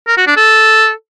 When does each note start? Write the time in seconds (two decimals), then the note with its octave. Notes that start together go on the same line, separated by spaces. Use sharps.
0.08 A#4
0.17 F#4
0.27 D4
0.37 A4